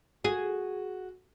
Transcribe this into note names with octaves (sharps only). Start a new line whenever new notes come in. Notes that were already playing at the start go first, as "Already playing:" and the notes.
F#4 G#4